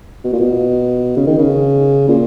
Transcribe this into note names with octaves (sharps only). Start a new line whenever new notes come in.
B2
A#2
B2
C#3
D#3
C#3
A#2